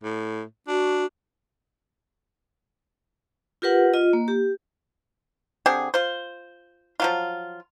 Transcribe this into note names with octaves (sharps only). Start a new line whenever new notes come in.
A2
D4 F#4
F4 G4 A#4 B4 F#5
F4 D#5
A#3
G4
D3 C4 G4 G#4
F4 C5
F3 F#3 F4